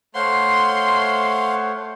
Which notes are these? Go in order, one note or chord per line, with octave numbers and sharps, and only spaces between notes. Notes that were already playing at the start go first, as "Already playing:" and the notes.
A3 C5 C#5 F5 F#5 C6